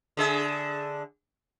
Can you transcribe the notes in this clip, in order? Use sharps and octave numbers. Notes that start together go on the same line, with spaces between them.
D3 G#4 E5